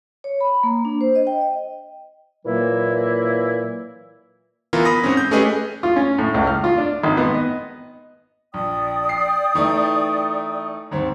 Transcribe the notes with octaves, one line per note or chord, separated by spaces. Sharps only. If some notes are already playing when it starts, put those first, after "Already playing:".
C#5
B5
A#3
D4
C5
D#5
G5
D#5
A#2 E3 F#3 A#3 E4
E3 B3 F4 A#4
B5 D#6 A#6
G#2 C4 C#4
G6
A3 C#4 G4 G#4 B4 D#5
F4
C#4
A2
C#2
F6
F4
D4
G#1
B3
D#5
A#1 D5 G5 D#6
C7
E3 A3 D#4
D#2 G#2 C4